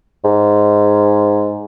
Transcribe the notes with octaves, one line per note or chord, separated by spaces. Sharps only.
G#2